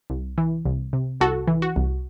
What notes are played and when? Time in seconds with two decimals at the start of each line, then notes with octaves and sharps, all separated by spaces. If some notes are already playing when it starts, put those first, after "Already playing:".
0.10 C2
0.38 E3
0.66 C2
0.93 C3
1.20 C2 F#4 A4
1.48 E3
1.62 F#4
1.76 C2